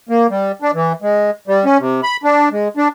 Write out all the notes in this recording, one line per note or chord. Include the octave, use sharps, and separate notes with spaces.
A#3
G3
D4
E3
G#3
G3
C#4
C3
B5
D4
G#3
D4